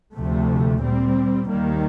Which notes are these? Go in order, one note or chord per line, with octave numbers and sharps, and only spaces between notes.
D2 C3 F3 A3
A#2 G3 C4
D#2 D#3 G3 A#3